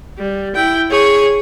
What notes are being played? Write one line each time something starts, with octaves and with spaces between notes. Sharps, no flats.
G3
E4 G5
G#4 C#5